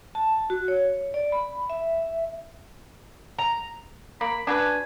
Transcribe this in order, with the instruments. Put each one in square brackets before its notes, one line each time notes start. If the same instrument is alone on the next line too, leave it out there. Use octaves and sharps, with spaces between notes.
[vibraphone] A5
F#4
C#5
D5
B5
E5
[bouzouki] A#5
[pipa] A#3 [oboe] B5
[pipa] D4 F#4 B4 [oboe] G#5